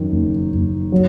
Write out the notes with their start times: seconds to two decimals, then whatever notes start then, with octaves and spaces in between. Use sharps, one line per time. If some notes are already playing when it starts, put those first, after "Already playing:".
Already playing: F#2 D#3
0.12 F#1
0.52 F#1
0.92 F#3